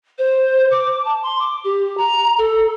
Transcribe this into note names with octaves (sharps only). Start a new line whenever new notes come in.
C5
D6
A5
C6
D6
G4
A#5
A4